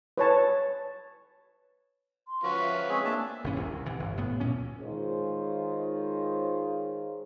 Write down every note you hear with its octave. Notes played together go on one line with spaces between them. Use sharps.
B4 C#5 A5
C6
F3 C#4 F4 F#4 B4
E5
G#3 C4 G#4 C#6
A#3 D4 E5 A5
G1 C3 E3 C#4
C2 C3
C3 E3
G1
A2 B3
D2 A#2 G3 C#4
D#3 G#3 F4 G#4 C5 C#5